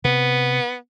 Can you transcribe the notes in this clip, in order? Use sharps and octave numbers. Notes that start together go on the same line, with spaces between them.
C3 B3